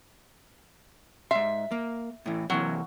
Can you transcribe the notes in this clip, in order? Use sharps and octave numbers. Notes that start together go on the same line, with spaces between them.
G#2 E5 C6
A#3
A2 E3
C3 E3 F#3 A#3